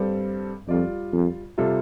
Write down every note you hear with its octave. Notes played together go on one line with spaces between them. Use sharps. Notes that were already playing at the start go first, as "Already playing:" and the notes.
Already playing: G2 G3 C4 A4 D5
F2 G3 F4 D5
F2
C3 G3 F4 A4